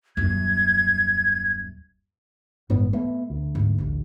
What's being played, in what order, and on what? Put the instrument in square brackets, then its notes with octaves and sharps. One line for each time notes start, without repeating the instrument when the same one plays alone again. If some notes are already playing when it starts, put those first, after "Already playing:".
[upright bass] D#1 F#2 [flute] G#6
[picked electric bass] G1 B3 [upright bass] A2 G#3
[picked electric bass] A3 B3 [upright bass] C4
[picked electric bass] D2
[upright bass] G#2 A#3
A1 D#2